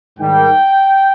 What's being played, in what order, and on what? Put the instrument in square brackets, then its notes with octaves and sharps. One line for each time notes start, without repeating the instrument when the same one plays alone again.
[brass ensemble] G#2 D#3 G3 G5